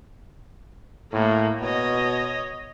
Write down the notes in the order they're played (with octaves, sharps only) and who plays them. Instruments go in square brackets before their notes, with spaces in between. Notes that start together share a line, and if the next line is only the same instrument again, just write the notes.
[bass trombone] A2 [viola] A#3
[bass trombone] B2 [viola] C#5 D#5